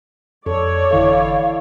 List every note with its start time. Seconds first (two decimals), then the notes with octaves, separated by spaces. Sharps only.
0.46 F2 A4 C#5 D5
0.91 G1 D3 E3 E4 A4 D#5 F5